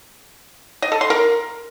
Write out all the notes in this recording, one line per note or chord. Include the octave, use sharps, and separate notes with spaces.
D#5
A4
C6
A#4